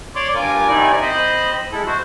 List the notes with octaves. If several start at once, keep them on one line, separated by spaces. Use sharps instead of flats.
C#5 D5 C6 D6
G2 F4 A#4 G#5 D6
C3 D#3 D#4 E4 D5 G#5
C4 C5 D#5 B5
G#3 E4 A4
F#4 C5